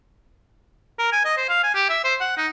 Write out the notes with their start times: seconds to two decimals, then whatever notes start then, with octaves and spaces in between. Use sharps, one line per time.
0.99 A#4
1.12 G#5
1.25 D#5
1.37 C5
1.49 F5
1.63 G#5
1.75 G4
1.90 E5
2.04 C5
2.21 F#5
2.37 D#4